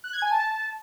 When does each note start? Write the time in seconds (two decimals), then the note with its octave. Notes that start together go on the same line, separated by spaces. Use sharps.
0.04 F#6
0.13 G#6
0.22 G#5
0.31 A5